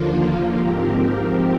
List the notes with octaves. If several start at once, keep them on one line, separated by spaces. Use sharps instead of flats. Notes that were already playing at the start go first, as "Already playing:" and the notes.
Already playing: D#2 D3 F3 A#3 F4
G#2 F3 C4 G4 A#4